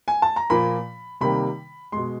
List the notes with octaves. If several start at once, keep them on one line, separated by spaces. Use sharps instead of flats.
G#5
A5
A#5
A#2 F3 A#3 B5
C3 D#3 G3 A#3 B5
B2 G#3 C6